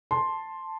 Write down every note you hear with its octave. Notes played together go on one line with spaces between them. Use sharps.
A5 C6